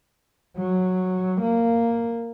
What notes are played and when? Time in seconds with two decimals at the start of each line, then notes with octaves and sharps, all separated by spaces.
0.57 F#3
1.41 A#3